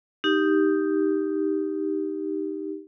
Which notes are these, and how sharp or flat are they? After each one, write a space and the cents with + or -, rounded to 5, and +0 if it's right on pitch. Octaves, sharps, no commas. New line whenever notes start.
D#4 +0 G4 +0